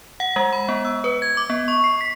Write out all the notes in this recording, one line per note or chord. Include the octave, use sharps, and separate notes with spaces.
F#5
G#3
B5
B3
E6
B4
G#6
D6
B3
C#6
C7
B6